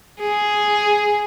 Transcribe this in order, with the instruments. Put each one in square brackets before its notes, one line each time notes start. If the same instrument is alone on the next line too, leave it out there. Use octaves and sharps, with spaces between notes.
[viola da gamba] G#4